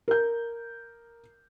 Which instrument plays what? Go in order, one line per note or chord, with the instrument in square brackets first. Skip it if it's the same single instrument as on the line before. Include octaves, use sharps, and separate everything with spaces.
[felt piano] A#4 G6